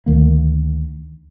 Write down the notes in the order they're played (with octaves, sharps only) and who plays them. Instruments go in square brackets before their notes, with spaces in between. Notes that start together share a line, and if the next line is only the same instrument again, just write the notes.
[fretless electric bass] D2 D#3 A#3